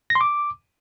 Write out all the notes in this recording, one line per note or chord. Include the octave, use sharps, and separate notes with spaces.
A#6
C6
D6